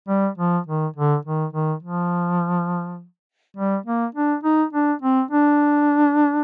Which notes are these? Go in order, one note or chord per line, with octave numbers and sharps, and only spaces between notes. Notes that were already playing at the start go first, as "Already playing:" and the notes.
G3
F3
D#3
D3
D#3
D#3
F3
G3
A#3
D4
D#4
D4
C4
D4